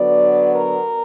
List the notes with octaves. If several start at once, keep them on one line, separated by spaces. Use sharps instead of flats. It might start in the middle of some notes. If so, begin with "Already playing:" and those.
Already playing: D3 F#3 B3 D5
A#4